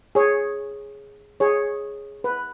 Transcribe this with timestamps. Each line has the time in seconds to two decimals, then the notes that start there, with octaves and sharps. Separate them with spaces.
0.15 G#4 C#5
1.40 G#4 C#5
2.24 B4